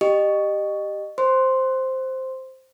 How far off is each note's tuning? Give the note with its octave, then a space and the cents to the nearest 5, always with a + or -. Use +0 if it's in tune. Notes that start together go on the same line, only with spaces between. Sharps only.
G4 +0 D#5 -25
C5 +0 C6 +0